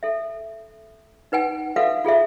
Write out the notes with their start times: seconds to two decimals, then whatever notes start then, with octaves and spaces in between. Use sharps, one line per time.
0.03 A4 E5
1.32 D#4 B4 F#5 G#5
1.76 F#4 A4 B4 E5 F5
2.05 F4 G#4 A4 E5